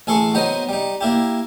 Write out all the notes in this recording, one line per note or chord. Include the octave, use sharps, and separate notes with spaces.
A1 G#4 A4 C6 C#6
F#3 B3 D#4 C5 D#5
G3 D#4
A#3 E4 G4